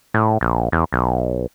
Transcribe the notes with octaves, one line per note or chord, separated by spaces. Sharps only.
A2
A#1
E2
B1